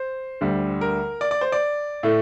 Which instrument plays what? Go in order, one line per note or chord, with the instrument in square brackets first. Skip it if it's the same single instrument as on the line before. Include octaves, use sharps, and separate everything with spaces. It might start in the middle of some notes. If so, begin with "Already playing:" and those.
Already playing: [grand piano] C5
D2 D3 G3
A#4
D5
D5
C5
D5
A2 A3